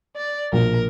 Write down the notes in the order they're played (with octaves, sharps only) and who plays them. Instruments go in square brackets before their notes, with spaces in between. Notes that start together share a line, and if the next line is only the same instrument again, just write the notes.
[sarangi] D5
[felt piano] A#1 [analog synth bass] B2 [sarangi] A#4